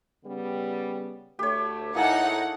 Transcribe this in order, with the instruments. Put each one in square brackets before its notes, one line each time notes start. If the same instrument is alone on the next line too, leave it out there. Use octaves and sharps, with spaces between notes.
[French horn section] C#3 G3 B3
[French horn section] D2 A3 [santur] G4 C#5
[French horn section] A2 E4 [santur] A#3 G#4 A4 [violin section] D#4 F#5